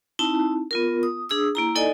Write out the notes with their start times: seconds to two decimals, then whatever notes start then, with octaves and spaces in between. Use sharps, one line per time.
0.19 C4 D#4 E4 A5
0.71 B3 F4 A#4
1.03 D#6
1.29 D4 G#4 D#6 E6
1.55 A#3 E4 A#5
1.75 D#4 A4 D5 D#5 G#5